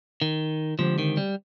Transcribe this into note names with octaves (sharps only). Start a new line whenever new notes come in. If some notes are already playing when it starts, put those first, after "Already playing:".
D#3
D3 F3 G#3 C4 G4 C5
D#3
G3